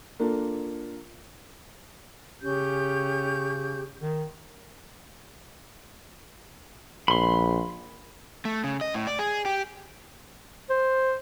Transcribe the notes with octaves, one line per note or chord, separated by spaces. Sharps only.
A#3 D4 F4 A4
C#3 C#4 G4 G6
D#3
A#1 B5 C6
A3
C#3
D#5
A2
D5
G#4
G4
C5